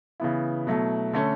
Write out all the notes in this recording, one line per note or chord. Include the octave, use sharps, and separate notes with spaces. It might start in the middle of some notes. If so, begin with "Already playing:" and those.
C#3 E3 B3 E4
B2 F#3 A3 E4
D3 A3 C#4